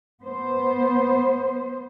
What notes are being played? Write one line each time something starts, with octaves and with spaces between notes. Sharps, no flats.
B3 C5